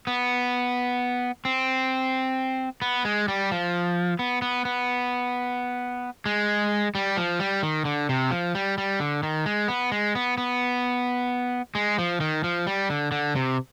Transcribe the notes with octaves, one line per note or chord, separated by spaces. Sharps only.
B3
C4
B3
G#3
G3
F3
B3
B3
B3
G#3
G3
F3
G3
D#3
D3
C3
F3
G3
G3
D3
D#3
G#3
B3
G#3
B3
B3
G#3
F3
D#3
F3
G3
D3
D3
C3